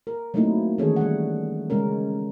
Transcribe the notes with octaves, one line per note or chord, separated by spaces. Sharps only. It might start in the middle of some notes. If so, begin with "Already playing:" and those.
A#4
F#3 A3 A#3 C4 D#4 E4
D#3 E3 C#4 G#4 A4 C#5
G3 F#5
C#3 G#3 C#4 A#4